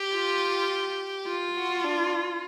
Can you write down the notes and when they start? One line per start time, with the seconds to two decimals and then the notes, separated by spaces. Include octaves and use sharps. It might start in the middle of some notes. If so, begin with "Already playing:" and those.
Already playing: G4
0.14 F4
1.27 F4
1.56 F#4
1.84 D4